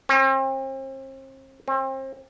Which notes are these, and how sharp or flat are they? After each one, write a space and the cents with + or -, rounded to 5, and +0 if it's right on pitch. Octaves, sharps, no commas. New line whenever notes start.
C4 +40
C4 +35